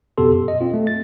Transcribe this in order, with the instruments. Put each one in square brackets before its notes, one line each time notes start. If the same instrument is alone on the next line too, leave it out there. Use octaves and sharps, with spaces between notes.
[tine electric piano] F2 B2 B3 G4 A4 C6
F#2
D#5
C4 F4
A3
A6